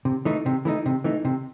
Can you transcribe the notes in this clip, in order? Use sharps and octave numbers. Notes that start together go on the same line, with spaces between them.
C3
E3 A3 D#4
C3
E3 A3 D#4
C3
E3 A3 D#4
C3